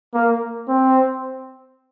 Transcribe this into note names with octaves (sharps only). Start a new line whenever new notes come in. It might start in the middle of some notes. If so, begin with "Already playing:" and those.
A#3
C4